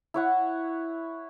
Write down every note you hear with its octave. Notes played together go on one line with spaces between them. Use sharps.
E4 C#5 F#5